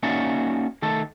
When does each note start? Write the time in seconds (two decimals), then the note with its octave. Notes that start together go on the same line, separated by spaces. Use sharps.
0.03 A#3 C#4 D#4 F#4 D5 E5
0.82 D#3 A3 A4